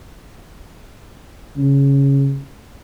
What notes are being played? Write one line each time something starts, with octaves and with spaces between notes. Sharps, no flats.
C#3